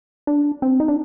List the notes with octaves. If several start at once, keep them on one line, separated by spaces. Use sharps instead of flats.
D4
C4
D#4
D4